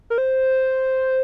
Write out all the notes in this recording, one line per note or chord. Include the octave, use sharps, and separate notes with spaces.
A#4
C5